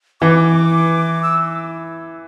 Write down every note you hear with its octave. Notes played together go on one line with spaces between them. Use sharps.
E3 D6
E6